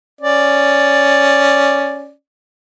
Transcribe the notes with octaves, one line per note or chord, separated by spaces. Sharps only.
C#4 D5